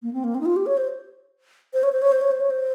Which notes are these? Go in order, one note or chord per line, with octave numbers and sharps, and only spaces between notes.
A#3
C4
A#3
C4
D#4
F4
G4
C#5
C5
C5
C#5
C5
C#5
C5
C#5
C5
C#5
C5